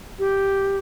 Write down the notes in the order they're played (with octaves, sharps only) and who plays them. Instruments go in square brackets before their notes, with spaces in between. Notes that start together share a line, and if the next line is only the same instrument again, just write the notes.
[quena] G4